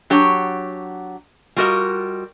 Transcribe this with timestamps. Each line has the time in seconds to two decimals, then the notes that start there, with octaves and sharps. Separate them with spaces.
0.10 F#3 D4 G4 C#5
1.56 G3 F4 F#4 A#4 D#5